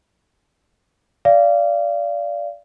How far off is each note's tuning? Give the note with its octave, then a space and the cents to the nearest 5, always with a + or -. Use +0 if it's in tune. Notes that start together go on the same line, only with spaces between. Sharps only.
D5 -15 F5 -25